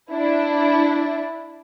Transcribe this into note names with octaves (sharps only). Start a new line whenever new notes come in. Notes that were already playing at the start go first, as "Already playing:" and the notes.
D4 E4